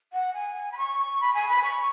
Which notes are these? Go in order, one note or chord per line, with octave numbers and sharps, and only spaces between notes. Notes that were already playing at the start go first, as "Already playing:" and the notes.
F#5
G#5
B5
C#6
B5
G#5
B5
C#6